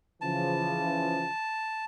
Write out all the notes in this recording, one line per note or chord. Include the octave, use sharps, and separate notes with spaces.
C#3 E3 F3 A5